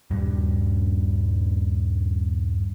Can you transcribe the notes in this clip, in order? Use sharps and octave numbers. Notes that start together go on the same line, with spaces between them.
D#1 G2